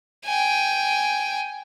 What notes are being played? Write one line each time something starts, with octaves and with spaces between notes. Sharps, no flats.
G5 G#5